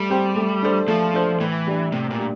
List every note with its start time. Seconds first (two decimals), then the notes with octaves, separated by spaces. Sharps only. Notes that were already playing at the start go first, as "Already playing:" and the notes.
Already playing: G3 A3
0.10 C4 G4 C5
0.36 A3
0.63 D4 A4 C5
0.88 F3 A3
1.14 D4 A4 C5
1.40 A2 E3
1.67 G3 D4
1.92 A2 C3
2.11 A#2
2.18 G3 D4